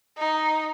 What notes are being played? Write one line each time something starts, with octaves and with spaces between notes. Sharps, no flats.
D#4